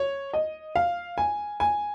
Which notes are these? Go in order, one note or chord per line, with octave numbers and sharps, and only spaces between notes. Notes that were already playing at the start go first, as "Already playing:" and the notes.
Already playing: C#5
D#5
F5
G#5
G#5